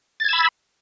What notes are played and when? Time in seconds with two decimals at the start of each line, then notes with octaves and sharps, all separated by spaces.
0.20 A6
0.24 G#6
0.29 E6
0.33 B5